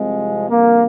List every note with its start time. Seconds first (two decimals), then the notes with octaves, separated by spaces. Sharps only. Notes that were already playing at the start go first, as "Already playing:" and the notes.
Already playing: C2 C3 F3 G#3
0.49 F2 D3 G3 A#3